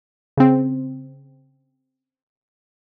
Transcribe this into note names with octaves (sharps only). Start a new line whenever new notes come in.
C#3 C4